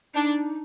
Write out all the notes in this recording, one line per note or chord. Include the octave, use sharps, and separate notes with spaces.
D4 D#4